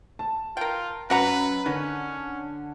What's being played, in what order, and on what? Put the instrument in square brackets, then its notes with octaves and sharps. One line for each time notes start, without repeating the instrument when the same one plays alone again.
[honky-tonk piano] A5
[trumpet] F4 [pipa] A#4 G5
[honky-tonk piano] F#2 [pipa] F#4 F#5 A#5 [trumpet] B4
[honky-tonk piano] D3 [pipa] D#3 [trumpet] C#4